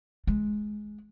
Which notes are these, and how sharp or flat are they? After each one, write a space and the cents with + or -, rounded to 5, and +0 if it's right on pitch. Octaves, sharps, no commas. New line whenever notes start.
G#3 +15